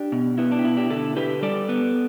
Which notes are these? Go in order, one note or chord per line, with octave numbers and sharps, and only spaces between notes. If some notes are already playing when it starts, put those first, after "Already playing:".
Already playing: D4 G4
B2
B3 E4
D4
G4
B2 E4
D4 G4
D3 E4 A4
D3 G4 B4
G3 A4 D5
B3